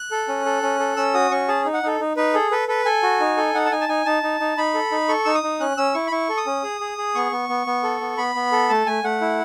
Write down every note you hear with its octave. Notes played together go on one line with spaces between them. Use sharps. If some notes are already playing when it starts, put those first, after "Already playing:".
Already playing: F#6
A4
C#4
A4
C#4
A4
C#4 E6
F#4 D#6
C#4 C#6
G#4 A5
D#4
F#5
D#4 A4
D#4
D#4 B4
G#4 A4
A4 B4
A4 B4
A4 G#5
F#4
D#4
A4
D#4 F#5
A5
D#4 G#5
A5
D#4 G#5
D#4 A5
D#4
D#4
D#4 B5
A4
D#4
A4 C#6
D#4 E6
D#6
D#4
C#4 F#6
C#4 E6
E4 C#6
B5
E4 C#6
A4
D#6
C#4
G#4
G#4
G#4
B3 C#6
B3
B3
B3
A4
B3
B3 B5
B3
A4
A3 A5
A3 G#5
A3 F#5
E4